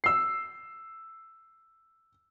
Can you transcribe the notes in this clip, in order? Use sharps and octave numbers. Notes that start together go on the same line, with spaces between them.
E6 C7